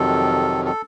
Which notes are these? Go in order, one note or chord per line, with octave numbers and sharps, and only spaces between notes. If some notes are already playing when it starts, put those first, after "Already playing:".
Already playing: F2 C3 D#3 F#3 A4
A4